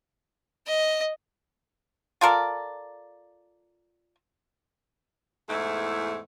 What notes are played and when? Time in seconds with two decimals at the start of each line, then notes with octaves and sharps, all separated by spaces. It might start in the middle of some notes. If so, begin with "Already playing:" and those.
0.67 D#5
2.21 F4 A4 A#4 D5
5.48 E2 G#2 A3 E4